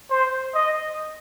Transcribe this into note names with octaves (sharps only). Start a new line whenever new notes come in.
C5
D#5